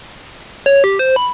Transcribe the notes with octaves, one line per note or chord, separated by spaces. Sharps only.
C#5
G4
C5
B5